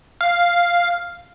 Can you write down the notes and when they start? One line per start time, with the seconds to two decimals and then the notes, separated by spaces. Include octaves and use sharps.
0.21 F5